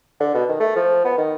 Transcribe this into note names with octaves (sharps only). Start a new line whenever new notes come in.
D3
B2
D#3
A3
F3
B3
D#3